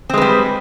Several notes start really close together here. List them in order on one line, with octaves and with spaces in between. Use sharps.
C4 G#3 B4 G3